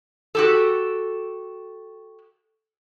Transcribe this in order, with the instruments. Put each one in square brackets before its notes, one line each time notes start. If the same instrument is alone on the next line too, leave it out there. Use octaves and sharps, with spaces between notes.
[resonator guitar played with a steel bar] F#4 G4 A4